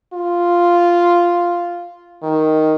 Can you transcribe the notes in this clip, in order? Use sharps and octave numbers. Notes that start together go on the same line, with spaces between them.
F4
D#3